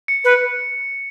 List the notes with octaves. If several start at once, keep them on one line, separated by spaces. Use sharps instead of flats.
C#7
B4